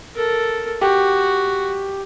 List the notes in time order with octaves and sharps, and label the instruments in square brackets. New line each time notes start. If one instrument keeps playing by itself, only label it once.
[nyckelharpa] A4 A#4
[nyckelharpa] F#4 [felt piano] G4